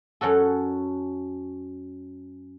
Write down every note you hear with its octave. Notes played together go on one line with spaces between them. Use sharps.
F#2 C#4 F#4 A4